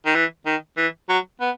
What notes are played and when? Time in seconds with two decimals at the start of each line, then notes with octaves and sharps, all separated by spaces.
0.06 D#3
0.15 E3
0.46 D#3
0.77 E3
1.09 F#3
1.41 B3